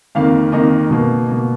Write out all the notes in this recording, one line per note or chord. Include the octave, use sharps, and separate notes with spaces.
F2 D#3 A#3 F5
F2 D#3 A#3 D#5
B2 A#3
B2 A#3